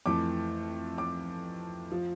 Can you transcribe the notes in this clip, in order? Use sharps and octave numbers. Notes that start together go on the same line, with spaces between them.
F2 E3 A3 D6
D6
F3